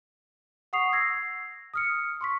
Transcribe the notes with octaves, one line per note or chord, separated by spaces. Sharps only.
F#5 C#6 D#6 C7 F7
E6 G#6 A#6 C7
D#6 F6 C#7
C6 C#6 B6